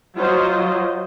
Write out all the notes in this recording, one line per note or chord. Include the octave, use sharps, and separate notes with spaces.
F#3 F4 C5 D#5